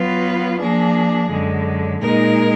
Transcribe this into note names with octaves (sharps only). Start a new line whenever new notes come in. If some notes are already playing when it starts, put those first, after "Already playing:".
Already playing: F#3 B3 F4 B4
F3 A#3 D4 G#4
F#2 D3 G#3
A#2 G#3 D#4 A#4